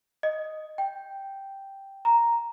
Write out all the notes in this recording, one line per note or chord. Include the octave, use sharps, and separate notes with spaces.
D#5
G5
A#5